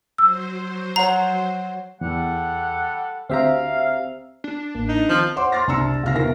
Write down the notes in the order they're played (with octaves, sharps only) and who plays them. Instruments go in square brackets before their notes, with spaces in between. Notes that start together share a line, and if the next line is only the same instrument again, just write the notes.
[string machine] F#3 C5 [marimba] E6
[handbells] C#5 F#5 C7 [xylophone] A#5
[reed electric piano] E2 [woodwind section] G3 A4 F#5
[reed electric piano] D2 G4 A#5 [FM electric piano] C4 E5 [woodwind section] F5
[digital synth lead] D4
[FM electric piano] A1 A#3
[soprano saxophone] D#4
[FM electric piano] D#3 C4 [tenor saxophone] F3 [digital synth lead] A5
[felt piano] C5 C#5 F#5 C6 D6
C6 D6 F6 A6 A#6
C2 D4 A#5 C6 E6 C#7
C#2 C3 F6 A#6
E1 E3 A#4 A#6